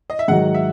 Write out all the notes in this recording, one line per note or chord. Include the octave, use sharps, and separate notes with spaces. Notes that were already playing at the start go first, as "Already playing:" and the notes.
D#5
E5
G#2 D#3 F#3 F#5
E5